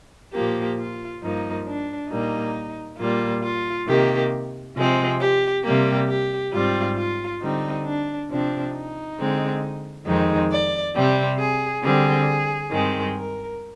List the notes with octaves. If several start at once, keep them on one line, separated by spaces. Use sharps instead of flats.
A#2 F3 A#3 G4
F4
G2 F3 A#3 D#4
D4
A#2 G3 A#3 D#4
A#2 G3 A#3 F4
F4
C3 D#3 A#3 G4
C3 F3 G#3 C4
G4
C3 G3 A#3 G4
G4
G#2 G3 C4 F4
F4
D3 G3 C4 D#4
D4
C3 F3 C4 D4
D#4
D3 G#3 C4
F2 D#3 G#3 C4 D#4
D5
C3 G3 C4
G#4
D3 G3 C4 G#4
G2 D#3 G#3 C4
A#4